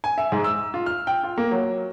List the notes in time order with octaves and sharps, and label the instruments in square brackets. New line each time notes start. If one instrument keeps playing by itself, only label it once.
[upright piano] G#5
E5
G#2
E6
F4
F6
G5
F4
A#3
F#3